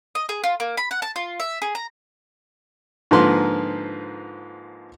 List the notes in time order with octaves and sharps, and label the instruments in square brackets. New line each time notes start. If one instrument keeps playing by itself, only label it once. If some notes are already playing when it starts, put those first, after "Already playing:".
[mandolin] D#5
G#4
F4
A#3
B5
F#5
A5
F4
E5
G#4
A#5
[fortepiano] G#2 D3 F3 A#3 B4 C6